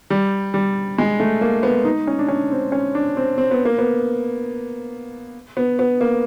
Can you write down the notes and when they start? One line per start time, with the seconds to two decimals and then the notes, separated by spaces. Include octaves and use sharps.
0.10 G3
0.54 G3
0.98 G#3
1.20 A3
1.41 A#3
1.63 B3
1.85 D#4
2.07 C#4
2.19 D4
2.28 C#4
2.51 C4
2.72 C#4
2.95 D4
3.17 C4
3.38 C4
3.51 B3
3.65 A#3
3.78 B3
5.57 B3
5.79 B3
6.01 A#3